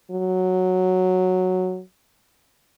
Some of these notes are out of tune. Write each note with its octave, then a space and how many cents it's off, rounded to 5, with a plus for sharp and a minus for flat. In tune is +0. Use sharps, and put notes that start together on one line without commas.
F#3 -5